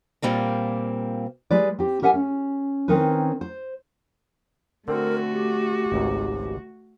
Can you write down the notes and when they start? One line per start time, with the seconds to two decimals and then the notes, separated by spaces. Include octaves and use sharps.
0.22 A#2 G3 A#3 C4
1.51 G3 G#3 B4 D5
1.79 C4 G4
2.02 G4 A#4 E5 F#5 G#5
2.14 C#4
2.88 D#3 C4 C#4 D#4 A#4 B4
3.41 C5
4.88 D3 A3 C4 F#4 A#4
5.32 G4
5.92 G#1 C#2 G#2